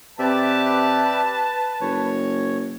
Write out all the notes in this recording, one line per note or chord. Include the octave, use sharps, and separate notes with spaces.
C3 G4 B4 D5 E5 A5
F#1 C#5